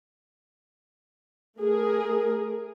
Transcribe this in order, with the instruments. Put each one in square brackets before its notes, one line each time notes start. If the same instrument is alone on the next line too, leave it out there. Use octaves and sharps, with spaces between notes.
[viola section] A3 G#4 A#4